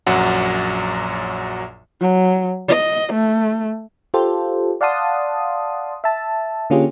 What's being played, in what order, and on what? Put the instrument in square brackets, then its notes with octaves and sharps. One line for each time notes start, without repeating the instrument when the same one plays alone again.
[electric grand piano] A#1 F#2 F#3 F#5
[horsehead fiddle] F#3
D#5
A3
[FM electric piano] F4 G4 A4 C5
D5 F5 F#5 A5 C6 D#6
E5 A5
D3 A#3 C#4 F4 G4 G#4